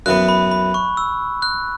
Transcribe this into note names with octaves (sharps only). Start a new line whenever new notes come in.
F#2 E3 B3 F#6
B5
B5
C#6
E6
F#6